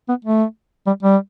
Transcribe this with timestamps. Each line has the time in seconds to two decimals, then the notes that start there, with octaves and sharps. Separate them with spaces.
0.09 B3
0.25 A3
0.87 G3
1.03 G3